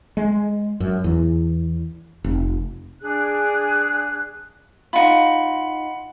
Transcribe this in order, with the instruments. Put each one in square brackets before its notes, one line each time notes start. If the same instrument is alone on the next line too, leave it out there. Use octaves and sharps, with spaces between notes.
[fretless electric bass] G#3
F#2
E2
F1
[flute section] D4 G#4 F#6
[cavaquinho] D#4 F4 [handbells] F#5 B5